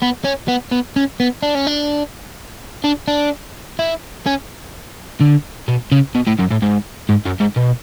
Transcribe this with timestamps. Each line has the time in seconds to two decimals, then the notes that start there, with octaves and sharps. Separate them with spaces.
0.02 B3
0.24 C#4
0.48 B3
0.71 B3
0.96 C#4
1.20 B3
1.43 D4
1.55 C#4
1.67 D4
2.84 D4
3.08 D4
3.79 E4
4.26 C#4
5.21 D3
5.68 B2
5.92 C#3
6.15 B2
6.27 A2
6.39 F#2
6.51 A2
6.63 G#2
7.09 G#2
7.26 F#2
7.40 G#2
7.56 B2